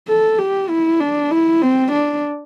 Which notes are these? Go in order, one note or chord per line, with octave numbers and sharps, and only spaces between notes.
A4
G4
E4
D4
E4
C4
D4